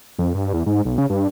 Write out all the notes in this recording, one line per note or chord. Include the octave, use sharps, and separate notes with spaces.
F2
G2
E2
G#2
B1
C#3
G2